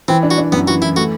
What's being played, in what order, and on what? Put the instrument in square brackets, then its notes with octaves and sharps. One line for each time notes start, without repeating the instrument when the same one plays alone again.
[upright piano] E3 [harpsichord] C4
[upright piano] D4
[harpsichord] F#4
[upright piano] D4
[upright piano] F#2 [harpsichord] B3
[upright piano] E3 [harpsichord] F#4
[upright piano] E3 [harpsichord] E4
[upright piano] A3 [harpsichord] F#4